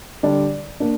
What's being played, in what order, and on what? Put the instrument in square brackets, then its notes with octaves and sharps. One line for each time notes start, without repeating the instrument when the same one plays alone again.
[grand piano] D3 G3 D4 D5
A#3 D4